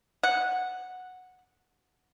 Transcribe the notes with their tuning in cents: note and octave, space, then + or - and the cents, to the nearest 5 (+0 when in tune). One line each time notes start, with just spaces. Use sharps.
F#5 -5